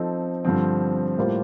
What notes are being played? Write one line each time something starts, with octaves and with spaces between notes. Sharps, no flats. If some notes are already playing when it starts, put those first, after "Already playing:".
Already playing: F3 C4 D#4 A4
G2 D3 F3 C4
A2 G3 A#3 F4 C5